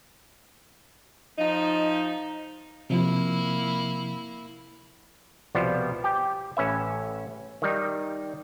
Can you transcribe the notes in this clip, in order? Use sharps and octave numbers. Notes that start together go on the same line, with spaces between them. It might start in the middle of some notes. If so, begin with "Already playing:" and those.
F3 D#4
C3 F3 A#3 E4
C2 B2 F3 G3 B3 C5
G4 G5
A1 C#4 B4 E5
D#3 G3 D#4